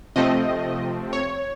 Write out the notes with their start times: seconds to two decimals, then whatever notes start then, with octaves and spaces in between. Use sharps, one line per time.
0.16 C3 F3 A3 C4 D#5
1.13 C#5